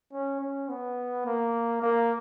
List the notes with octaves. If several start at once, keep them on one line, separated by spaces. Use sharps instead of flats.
C#4
C#4
B3
A#3
A#3